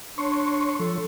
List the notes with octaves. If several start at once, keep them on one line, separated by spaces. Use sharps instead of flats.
D4 C#5 C6 C#6
F3 A4